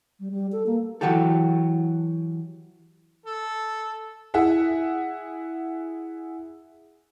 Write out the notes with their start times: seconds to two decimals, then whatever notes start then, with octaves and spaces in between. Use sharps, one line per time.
0.20 G3
0.31 G3
0.52 A4
0.66 A#3
1.01 E3 F#3 F#4 G4 A4
3.25 A4
4.34 E4 G#4 E5 F#5